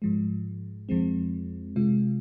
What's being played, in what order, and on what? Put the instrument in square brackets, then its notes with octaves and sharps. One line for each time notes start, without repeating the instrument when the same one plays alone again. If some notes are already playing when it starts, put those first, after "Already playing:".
[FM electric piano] G#2 F3 G#3
F2 F3 G#3 C4
C3 G#3 F4